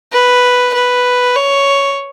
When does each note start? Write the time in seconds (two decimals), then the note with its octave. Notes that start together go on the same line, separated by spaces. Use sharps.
0.13 B4
0.74 B4
1.36 C#5